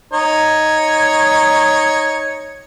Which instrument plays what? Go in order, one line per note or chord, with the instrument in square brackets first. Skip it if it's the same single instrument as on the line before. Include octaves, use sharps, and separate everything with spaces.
[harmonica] D#4 C#5